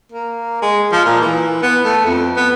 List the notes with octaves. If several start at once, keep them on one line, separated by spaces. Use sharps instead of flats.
A#3
G#3
F3
A#2
E3
B3
A3
F2
B3